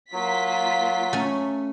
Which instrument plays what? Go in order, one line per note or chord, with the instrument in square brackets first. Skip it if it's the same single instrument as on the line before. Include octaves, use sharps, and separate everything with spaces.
[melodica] F#3 [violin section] A#3 F4 B6
[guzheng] A3 C#4